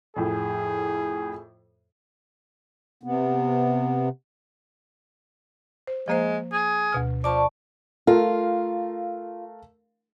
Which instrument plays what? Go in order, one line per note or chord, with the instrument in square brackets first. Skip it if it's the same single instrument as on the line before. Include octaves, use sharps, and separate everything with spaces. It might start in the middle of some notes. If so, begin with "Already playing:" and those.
[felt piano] F2 A2 [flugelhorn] G#4
[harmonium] C3 B3
[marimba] C5
[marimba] F3 A#3 C5 [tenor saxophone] G#3
[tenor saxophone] G#4
[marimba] D2 B2 F6
[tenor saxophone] F3 [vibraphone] D5 A5 C#6 [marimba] D6
[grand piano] A3 A#4 F5 [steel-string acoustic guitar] F4